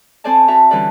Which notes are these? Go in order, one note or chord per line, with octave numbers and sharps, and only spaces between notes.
C4 A4 C5 D5 G#5 A5
F#4 E5 A5 A#5
D3 E3 G3 C#4 B4 D5